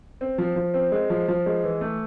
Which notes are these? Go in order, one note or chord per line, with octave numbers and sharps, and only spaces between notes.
C4
F3
F3
C4
G#3
F3
F3
G#3
E3
A3